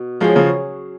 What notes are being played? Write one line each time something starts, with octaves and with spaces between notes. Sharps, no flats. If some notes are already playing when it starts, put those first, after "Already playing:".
Already playing: B2
F3 F#3 G#3 C#4 G#4
C#3 F3